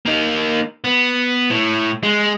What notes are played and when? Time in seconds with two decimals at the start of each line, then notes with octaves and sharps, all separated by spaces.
0.06 A#3 D#4
0.84 B3
1.51 A2
2.03 G#3